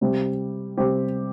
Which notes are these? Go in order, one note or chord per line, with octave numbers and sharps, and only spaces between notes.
C3 G3 C4 G4
C3 G3 C4 G4